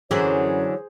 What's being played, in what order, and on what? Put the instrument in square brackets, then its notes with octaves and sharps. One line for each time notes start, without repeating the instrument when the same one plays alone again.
[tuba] F#2 [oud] D3 E3 F#3 [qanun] G#4 C5 [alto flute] C#5